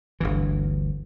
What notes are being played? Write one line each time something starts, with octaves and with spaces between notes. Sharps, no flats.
G1 D2 E3